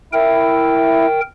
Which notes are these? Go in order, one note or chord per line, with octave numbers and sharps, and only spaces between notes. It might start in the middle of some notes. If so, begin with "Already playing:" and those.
E4 A#4 G5